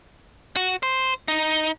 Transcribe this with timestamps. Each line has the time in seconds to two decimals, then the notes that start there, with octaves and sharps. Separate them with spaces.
0.56 F#4
0.83 C5
1.28 D#4